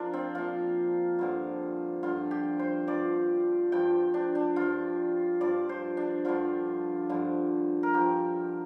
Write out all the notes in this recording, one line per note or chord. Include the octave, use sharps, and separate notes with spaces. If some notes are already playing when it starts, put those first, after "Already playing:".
Already playing: F3 D4 F4 A#4
C4
A#2 F3 F4
G2 D3 F3
G2 D3 F3 F4
G4
C5
G2 F3 D5
G2 F3 G5
D4
D4
G2 F3 F4
G2 F3 D5
C5
D4
G2 D3 F3 F4
G2 D3 F3
A#4
G2 F3 G4